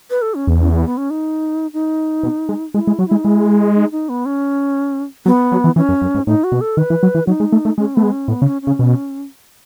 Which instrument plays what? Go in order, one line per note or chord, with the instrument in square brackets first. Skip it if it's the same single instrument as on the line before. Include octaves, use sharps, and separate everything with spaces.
[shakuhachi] B4
A4
C#4
[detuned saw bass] E2
[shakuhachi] C#4
B3
B3
C#4
D#4
D#4
[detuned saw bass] B2
G#3
[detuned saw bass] G#3 [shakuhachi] E4
[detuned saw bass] G#3
[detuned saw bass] F#3 [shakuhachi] F#4
[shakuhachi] E4
[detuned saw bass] G#3
[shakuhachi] D#4
[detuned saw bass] G#3 [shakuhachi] E4
[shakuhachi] D#4
D#4
B3
C#4
[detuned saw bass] F#3 [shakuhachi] B3
[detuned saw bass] F#3
E3
[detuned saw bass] E3 [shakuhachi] C#4
[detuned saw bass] F#2
F#2
G#2
[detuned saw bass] A2 [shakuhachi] D#4
[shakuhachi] F#4
[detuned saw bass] B2
[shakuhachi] A4
[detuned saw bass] D#3 [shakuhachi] B4
[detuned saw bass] E3
F#3
E3
[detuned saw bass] F#3 [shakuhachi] D#4
[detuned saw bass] G#3
A3
A3
[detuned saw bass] G#3 [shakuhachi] C#4
[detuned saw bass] A3 [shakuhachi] B3
[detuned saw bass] G#3
[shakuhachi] C#4
[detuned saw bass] A2 [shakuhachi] B3
[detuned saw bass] C#3
[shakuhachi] C#4
C#4
[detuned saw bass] C#3
B2